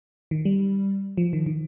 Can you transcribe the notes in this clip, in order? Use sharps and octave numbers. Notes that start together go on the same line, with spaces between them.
D#3
G3
F3
D#3
D#3